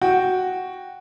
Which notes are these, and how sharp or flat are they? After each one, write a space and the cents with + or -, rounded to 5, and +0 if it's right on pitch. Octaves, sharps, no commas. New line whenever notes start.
F#4 +0 G5 +0